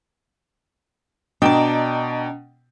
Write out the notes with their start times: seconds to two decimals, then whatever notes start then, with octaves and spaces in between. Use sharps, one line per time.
1.42 B2 D4 D5 D#5 G5 A#5